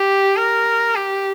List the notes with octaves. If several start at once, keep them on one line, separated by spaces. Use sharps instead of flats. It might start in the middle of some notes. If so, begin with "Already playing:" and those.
Already playing: G4
A#4
G4